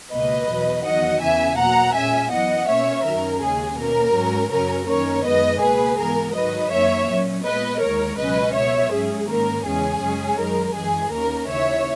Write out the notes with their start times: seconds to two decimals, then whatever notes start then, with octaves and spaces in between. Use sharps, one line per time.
0.11 C#2 B2 A#3 B4 D#5
0.48 E2 B2 F#3
0.85 E2 D#3 F#3 D#5 F#5
1.21 E2 C#3 E3 B3 E5 G#5
1.58 B2 F#3 A#3 F#5 A#5
1.94 A#2 G#3 C#4 E5 G#5
2.31 F#2 E3 B3 D#5 F#5
2.68 B2 A#3 C#4 C#5 E5
3.05 F#2 D#3 F#3 C#4 A#4
3.41 D#2 C#3 G#3 G#4
3.78 B2 A#3 C#4 A#4
4.14 G#2 F#3 C#4
4.51 F#2 C#3 F#3 C#4 A#4
4.88 F#2 D#3 A#3 C#4 A#4 C#5
5.25 F#2 D#3 G#3 B3 B4 D#5
5.61 C#2 B2 A#3 G#4 B4
5.98 G#2 E3 B3 A#4
6.35 G#2 D#3 F#3 B4 D#5
6.71 F#2 D#3 A#3 C#4 C#5 E5
7.08 A#2 F#3 C#4
7.45 A#2 G#3 B3 B4 D#5
7.81 D#2 D#3 G#3 A#4 C#5
8.18 C#2 B2 F#3 C#4 B4 D#5
8.55 B2 F#3 B3 C#5 E5
8.92 G#2 F#3 C#4 G#4
9.28 G#2 D#3 A#3 C#4 A#4
9.65 E2 C#3 G#3 C#4 G#4
10.02 F#2 C#3 G#3 C#4
10.38 F#2 D#3 G#3 A#4
10.75 F#2 E3 G#3 G#4
11.11 D#2 D#3 A#3 C#4 A#4
11.48 D#2 C#3 E3 C#5 E5